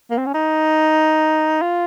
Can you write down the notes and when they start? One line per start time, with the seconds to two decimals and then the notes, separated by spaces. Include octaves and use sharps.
0.10 A#3
0.18 C4
0.26 C#4
0.34 D#4
1.61 F4